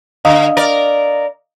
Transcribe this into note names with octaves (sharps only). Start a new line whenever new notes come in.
D3 D#5 F5 D#6
A#4 D5